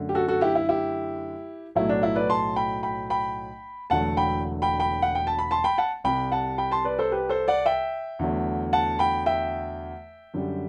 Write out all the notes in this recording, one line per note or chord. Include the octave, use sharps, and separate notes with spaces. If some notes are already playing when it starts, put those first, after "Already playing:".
Already playing: F#2 D3 A3
G4
F#4 A4
F#4 A4
E4 G4
E4
E4 G4
B1 A2 F#3 A3 E4
D4
E4
B4 D5
A5 C6
G5 B5
G5 B5
G5 B5
E1 E2 D3 F#3 A3 F#5 A5
G5 B5
G5 B5
G5 B5
F#5
G5
A5
B5
A5 C6
G5 B5
F#5 A5
C2 C3 G3 G5 B5
F#5 A5
G5 B5
A5 C6
B4 D5
A4 C5
G4 B4
A4 C5
D5 F#5
E5 G5
E2 D3 F#3 A3
F#5 A5
G5 B5
E5 G5
F#2 D3 G3